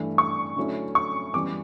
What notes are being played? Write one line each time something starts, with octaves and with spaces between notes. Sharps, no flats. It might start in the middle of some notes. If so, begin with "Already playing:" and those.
Already playing: G2 E3 A3
C#6
D3 F#3 A3 C#4 E4
C#6
F#2 E3 G3 B3 D6